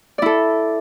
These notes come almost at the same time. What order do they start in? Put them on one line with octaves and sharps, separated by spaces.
D5 E4 A4